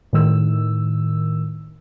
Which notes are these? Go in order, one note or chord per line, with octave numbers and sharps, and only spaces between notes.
A2 D#3 E6